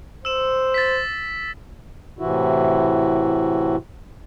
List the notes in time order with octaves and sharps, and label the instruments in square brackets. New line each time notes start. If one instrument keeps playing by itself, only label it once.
[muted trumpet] C5 [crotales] E6 E7
[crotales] A6 B6
[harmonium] A2 C3 E3 E4 F#4